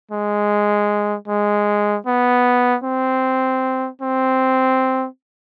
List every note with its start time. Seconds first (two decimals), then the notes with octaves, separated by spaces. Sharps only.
0.11 G#3
1.28 G#3
2.06 B3
2.84 C4
4.02 C4